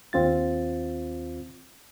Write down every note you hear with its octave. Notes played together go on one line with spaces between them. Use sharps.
D#2 C4 F4 A6